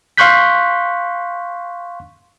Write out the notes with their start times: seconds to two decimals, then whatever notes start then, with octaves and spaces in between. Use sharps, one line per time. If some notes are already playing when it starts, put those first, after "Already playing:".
0.17 F5 C6 C#6 F#6 G6 B6